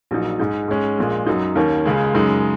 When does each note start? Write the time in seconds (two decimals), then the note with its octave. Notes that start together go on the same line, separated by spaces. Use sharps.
0.11 A#1 A#2 F#3 D#4
0.39 G#2 G#3 D#4
0.68 G#2 G#3 C#4
0.98 A#1 A#2 G#3
1.26 F#2 F#3 D#4
1.55 D#2 D#3 A#3 C#4
1.85 C#2 C#3 G#3
2.14 F#2 C#3 G#3 D#4